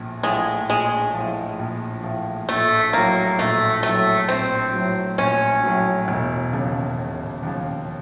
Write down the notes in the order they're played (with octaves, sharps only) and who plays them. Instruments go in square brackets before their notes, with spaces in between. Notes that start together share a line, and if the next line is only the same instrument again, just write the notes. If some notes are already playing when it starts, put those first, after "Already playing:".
Already playing: [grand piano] A#1 A2 F3
[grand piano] A2 F3 [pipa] G#3
[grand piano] A#1 [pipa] G#3
[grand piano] A2 F3
A#1
A2 F3
[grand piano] A#1 [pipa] A3
[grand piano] A2 F#3 [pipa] A#3
[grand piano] A#1 [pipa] A3
[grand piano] A2 F#3 [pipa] A3
[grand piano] A#1 [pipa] C4
[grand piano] A2 F#3
[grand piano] A#1 [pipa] C#4
[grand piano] A2 F#3
E1
D#2 C#3 F3
E1
D#2 C#3 F3